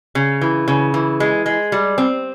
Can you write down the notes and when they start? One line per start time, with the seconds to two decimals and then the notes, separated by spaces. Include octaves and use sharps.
0.15 C#3
0.41 E3
0.68 C#3
0.94 E3
1.20 G#3
1.46 G#3
1.72 G3
1.98 C4